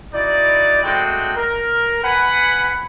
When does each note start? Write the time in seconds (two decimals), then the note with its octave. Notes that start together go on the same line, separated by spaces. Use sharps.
0.13 D#4 E4 F#4 D5
0.83 G#3 A3 C4 D4 F#4 G5
1.36 A#4
2.03 B4 F#5 G#5 B5